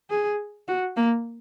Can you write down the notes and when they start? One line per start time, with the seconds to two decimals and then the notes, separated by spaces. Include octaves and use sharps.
0.10 G#4
0.68 F#4
0.96 A#3